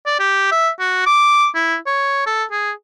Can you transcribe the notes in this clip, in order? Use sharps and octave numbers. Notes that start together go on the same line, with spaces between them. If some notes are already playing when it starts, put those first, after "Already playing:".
D5
G4
E5
F#4
D6
E4
C#5
A4
G#4